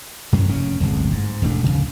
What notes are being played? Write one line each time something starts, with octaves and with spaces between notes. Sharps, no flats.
F#2 F#3 C#4
F1 A#2 C#3 C#4
D1 G1 C2 G#3
G#2
E1 A1 A3 D4
D1 C#2 C#3